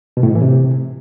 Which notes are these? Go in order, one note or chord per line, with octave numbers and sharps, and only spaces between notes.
B2
A2
G#2
E3
C3